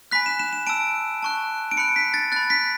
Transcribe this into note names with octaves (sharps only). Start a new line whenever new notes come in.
G#5 B5 F#6 B6
E7
E7
E7
A5 E6 D7
A5 C#6 F#6
D7
B5 F#6 C#7
B6
A6
B5 F#6 A6
B6